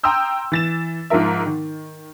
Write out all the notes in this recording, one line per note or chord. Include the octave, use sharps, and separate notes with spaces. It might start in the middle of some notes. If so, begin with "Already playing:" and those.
G5 A#5 C6 D#6 E6 G6
E3 A6 E7
G#2 F3 F4 A#4 E5
D#3